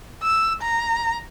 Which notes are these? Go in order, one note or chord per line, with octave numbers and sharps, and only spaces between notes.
E6
A#5